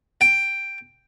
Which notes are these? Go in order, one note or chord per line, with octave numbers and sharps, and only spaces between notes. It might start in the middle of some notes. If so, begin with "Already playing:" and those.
G5